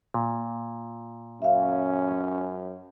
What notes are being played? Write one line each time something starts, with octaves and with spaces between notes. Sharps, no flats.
A#2
F#2 C#4 E5 F5